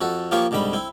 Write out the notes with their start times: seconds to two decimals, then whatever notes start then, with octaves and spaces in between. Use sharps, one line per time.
0.01 F2 F#4 A4
0.31 F3 A#3 F4 G4 C#5 C#6
0.51 C2 G#2 D3 G3 B5
0.73 C4 E4